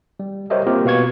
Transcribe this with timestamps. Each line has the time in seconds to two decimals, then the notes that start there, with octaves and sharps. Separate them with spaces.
0.20 G3
0.50 G4 A#4 C5 C#5 D#5 E5
0.67 A#3 C4 F4 G4 A#4
0.85 B2 B4 F5 C#6 G#6